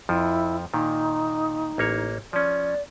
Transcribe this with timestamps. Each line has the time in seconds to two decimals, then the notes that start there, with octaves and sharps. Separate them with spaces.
0.09 F2 F3 E4
0.74 A#2 D#3 D#4
1.78 A1 A#3 C#5
2.33 F3 C#4 D5